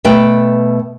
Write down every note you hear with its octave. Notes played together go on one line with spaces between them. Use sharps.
B2 A3 B4 G5